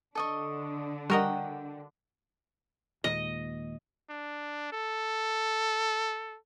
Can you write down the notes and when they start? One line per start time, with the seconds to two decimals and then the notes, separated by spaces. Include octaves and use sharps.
0.15 D3 D4 A4 D#5 C#6
1.10 G3 F#4 A#4 D#5 F#5 G5
3.04 D#2 A#2 G#3 D#5
4.10 D4
4.72 A4